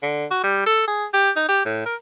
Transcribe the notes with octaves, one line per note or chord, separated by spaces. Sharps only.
D3
F#4
G3
A4
G#4
G4
D#4
G4
A2
A#4